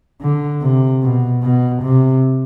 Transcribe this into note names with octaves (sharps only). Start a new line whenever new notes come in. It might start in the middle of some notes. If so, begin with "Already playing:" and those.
D3
C3
B2
B2
C3